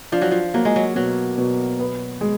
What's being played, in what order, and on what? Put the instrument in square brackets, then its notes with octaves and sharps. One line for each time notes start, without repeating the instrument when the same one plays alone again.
[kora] F3 [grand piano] D4
[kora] F#3
F3
[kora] F#3 [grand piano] A#3
[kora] G#3
F#3
[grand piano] B2 [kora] F#3
[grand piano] B2
B3
G#3